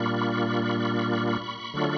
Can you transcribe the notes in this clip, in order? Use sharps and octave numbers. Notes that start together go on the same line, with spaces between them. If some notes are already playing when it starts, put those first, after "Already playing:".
Already playing: A#2 G3 A#3 D4 F4 B5 C#6
D3 F#3 A3 D4 F4